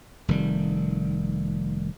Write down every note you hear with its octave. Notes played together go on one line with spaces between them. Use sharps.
F1 D#3 G3